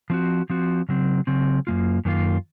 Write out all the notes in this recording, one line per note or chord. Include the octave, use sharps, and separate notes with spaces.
F3 C4 F#4
F3 C4 F#4
C#3 F#3 C4
C#3 F#3 C4
F#2 D#3 A#3 F4
F#2 D#3 A#3 F4